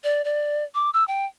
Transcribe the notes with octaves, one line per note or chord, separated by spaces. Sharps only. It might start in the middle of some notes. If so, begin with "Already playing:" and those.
D5
D5
D6
E6
G5